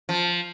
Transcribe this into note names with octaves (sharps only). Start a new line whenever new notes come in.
F3